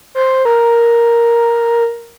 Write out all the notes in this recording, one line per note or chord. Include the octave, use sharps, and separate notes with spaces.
C5
A#4